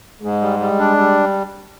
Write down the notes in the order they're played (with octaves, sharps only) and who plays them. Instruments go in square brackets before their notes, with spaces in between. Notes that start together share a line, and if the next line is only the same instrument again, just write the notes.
[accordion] G#2 [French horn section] G#3
[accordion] G3
G3
D4
G3